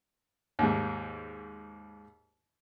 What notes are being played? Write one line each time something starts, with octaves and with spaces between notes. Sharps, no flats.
D#2 G#2